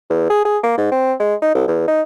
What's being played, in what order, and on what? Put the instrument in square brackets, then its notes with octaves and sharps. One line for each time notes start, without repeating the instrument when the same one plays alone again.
[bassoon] E2
G#4
G#4
A#3
G#2
C4
G#3
D#4
C2
E2
D#4